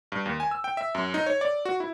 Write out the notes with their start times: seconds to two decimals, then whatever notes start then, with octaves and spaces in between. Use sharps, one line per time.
0.12 G2
0.26 D#2
0.40 G#5
0.51 E6
0.64 G5
0.77 E5
0.95 F#2
1.14 D#4
1.26 C#5
1.41 D5
1.65 F#4
1.80 E4